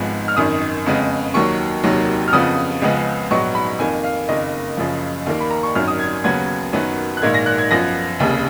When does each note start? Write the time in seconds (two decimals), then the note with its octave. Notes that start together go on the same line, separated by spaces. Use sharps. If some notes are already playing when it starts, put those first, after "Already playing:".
Already playing: G#1 G#2 F3 G#3 B3
0.28 F6
0.36 G#1 F#2 D#3 D#6
0.86 F2 C#3 G#3 B3
1.34 D#2 D#3 F#3 C#6
1.84 F1 D#2 D#3 F#3
2.28 F6
2.33 F2 C#3 F3 B3 D#6
2.82 C#2 C#3 F3 G#3 B3
3.31 A#1 G#2 F#3 B3 C#6
3.55 B5
3.79 F2 D#3 A#3 G#5
4.04 F5
4.28 F#1 F2 D#3 A#3 D#5
4.77 F#1 F#2 C#3 F3
5.26 D#2 D#3 A#3 F5
5.40 B5
5.50 A#5
5.63 C#6
5.75 G#1 F#2 D#3 F#3 F6
5.88 D#6
5.99 G#6
6.24 D#2 C#3 F#3 B3 G#6
6.73 F#2 D#3 F#3 B3
7.17 F#6
7.22 A#1 G#2 D#3 A#3 G#6
7.34 A#6
7.46 F#6
7.58 G#6
7.71 F#2 F3 B3 A#6
8.19 F1 D#2 C#3